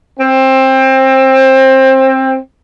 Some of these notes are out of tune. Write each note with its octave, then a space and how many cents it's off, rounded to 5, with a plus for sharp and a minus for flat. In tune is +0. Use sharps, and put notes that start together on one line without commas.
C4 +20